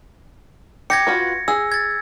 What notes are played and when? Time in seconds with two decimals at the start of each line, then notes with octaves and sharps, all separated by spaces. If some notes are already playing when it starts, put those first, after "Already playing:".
0.90 G4 G#6 A#6 C#7
1.07 F4 F#4 B4
1.48 G#4 E6
1.72 G#6 A6